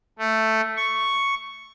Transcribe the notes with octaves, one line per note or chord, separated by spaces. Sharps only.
A3
C#6